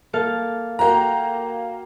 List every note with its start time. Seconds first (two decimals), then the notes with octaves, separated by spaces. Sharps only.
0.13 A#3 A4 F5
0.79 A#3 F#4 G5 A#5